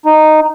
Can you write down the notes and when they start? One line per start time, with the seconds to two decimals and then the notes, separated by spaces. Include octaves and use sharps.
0.05 D#4